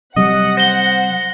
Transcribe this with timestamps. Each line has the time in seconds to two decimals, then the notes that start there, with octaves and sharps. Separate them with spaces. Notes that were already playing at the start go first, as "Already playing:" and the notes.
0.16 C3 F#3 G3 D#5 F#5
0.57 C5 A#6 G7